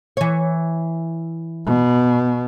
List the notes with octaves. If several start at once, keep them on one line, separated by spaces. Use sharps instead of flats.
E3 C#5
B2